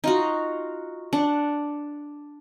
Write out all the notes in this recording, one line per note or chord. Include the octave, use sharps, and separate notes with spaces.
D#4 F4 F#4
D4 F#5